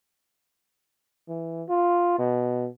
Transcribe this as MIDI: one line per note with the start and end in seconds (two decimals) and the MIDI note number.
1.29 1.64 52
1.69 2.17 65
2.19 2.68 47